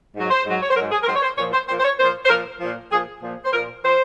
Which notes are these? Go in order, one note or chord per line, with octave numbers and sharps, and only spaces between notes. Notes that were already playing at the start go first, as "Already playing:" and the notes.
G#2 F#3
C5
G#2 F#3
C#5
C5
G#2 F#3 A#4
G#4
A#4
G#2 F#3 C5
C#5
C5
A#2 F3 C#5
C5
A#2 F3 C5
C5
C#5
A#2 F3 C5
C5
A#2 F3 A#4
A#2 F3
A#2 F3 G#4
A#2 F3
C5
A#2 F3 A#4
F3 C5